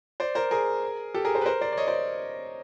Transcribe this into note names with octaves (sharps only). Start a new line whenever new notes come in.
C5 D5
A#4 C5
G#4 A#4
G4 A4
G#4 A#4
A#4 C5
B4
A#4 C5
C5 D5
D5
C#5 D#5
C5 D5